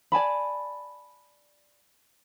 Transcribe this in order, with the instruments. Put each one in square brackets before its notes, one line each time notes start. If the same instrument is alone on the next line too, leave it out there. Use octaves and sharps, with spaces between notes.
[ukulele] D5 G#5 A5 B5